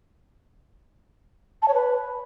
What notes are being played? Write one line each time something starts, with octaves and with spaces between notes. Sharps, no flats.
A5
C#5
B4